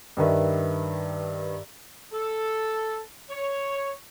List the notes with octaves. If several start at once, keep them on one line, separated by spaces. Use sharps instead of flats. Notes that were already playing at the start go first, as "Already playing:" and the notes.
G2 D#3 B4 E5
A4
C#5